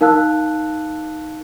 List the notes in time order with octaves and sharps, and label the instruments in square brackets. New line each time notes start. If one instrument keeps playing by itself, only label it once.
[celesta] D#4 A#4 F5 A5 E6 F#6